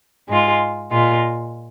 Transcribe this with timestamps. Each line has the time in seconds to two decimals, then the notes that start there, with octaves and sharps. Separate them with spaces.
0.28 G#2 G#3 F4
0.91 A#2 G#3 F4